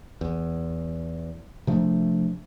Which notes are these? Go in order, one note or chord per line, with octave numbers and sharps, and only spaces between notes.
E2
C3 F3 A3 D4